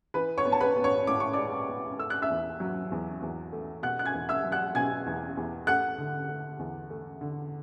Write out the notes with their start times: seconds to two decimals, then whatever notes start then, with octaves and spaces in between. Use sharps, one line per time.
0.14 E3 B4 B5
0.38 C#5 C#6
0.45 B3
0.52 A5
0.61 B4 B5
0.76 B3
0.84 C#5 C#6
1.07 A2 D6
1.20 C#6
1.33 G#3 D5 D6
1.68 B3
1.99 A3 E6
2.10 F#6
2.22 E5 E6
2.30 E2
2.60 F#3
2.92 E2
3.22 E2
3.52 A3
3.83 B2 F#5 F#6
3.99 F#6
4.06 G#5 G#6
4.14 E2
4.29 E5 E6
4.44 F#3
4.52 F#5 F#6
4.75 B2 G#5 G#6
5.06 E2
5.37 E2
5.67 A3 F#5 F#6
5.98 D3
6.29 A3
6.59 E2
6.90 A3
7.21 D3